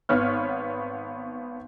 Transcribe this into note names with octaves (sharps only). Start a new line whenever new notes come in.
G#1 B3 C#5 F6